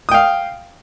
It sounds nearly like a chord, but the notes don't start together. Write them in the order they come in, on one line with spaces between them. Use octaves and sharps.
D#6 G5 F5